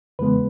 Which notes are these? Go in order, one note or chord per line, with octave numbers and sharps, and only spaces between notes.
E2 C#3 E3 G#3 B3 B4